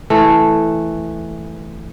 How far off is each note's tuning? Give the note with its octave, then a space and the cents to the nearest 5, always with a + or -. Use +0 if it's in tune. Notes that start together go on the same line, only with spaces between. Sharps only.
E3 +0 A3 +0